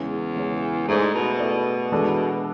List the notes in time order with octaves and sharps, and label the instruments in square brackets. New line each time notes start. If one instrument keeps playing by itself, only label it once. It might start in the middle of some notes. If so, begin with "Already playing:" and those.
Already playing: [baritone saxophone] E2 [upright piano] C#3 G#3 C#4
[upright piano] C#3 G#3 C#4
[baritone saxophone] G#2 [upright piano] A3 E4 G#4 D5
[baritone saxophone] B2
[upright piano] A3 E4 G#4 D5
E3 G#3 D4 F#4 A4